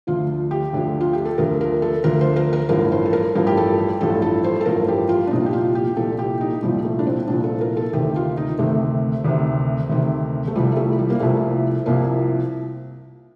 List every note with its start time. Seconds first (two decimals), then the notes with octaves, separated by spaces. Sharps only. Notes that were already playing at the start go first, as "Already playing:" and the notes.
0.07 D2 D3 F3 F4
0.51 G4
0.73 D2 D3 F3
1.01 F4
1.13 G4
1.25 A4
1.38 D2 D3 F3 A#4
1.61 A#4
1.82 A4
2.04 D2 D3 F3 A#4
2.21 C5
2.36 A#4
2.53 A#4
2.69 A1 G2 F3 A#4
2.92 C5
3.05 A4
3.13 A#4
3.35 A1 G2 F3 A#4
3.47 G4
3.57 A4
3.78 G4
4.00 A1 G2 F3 A4
4.22 A4
4.44 C5
4.61 A4
4.66 A1 G2 F3 A#4
4.88 G4
5.09 F4
5.27 D4
5.31 C2 A#2 F3 D#4
5.46 G4
5.53 F4
5.75 G4
5.96 C2 A#2 F3 A4
6.19 G4
6.41 D#4
6.63 C2 A#2 F3 G3
6.85 A3
6.99 D4
7.07 C4
7.27 C2 A#2 F3 D4
7.44 A4
7.61 A#4
7.77 A4
7.93 D2 C3 D#3 G4
8.16 F4
8.37 D#4
8.59 D2 C3 D#3 A3
9.24 D2 C3 D#3
9.90 D2 C3 D#3
10.47 A3
10.55 C2 C3 F3 G3
10.77 A3
10.99 G3
11.10 A#3
11.20 C2 C3 F3 A3
11.86 C2 C3 F3 A#3